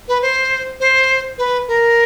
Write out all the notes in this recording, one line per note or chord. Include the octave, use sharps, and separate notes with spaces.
B4
C5
C5
B4
A#4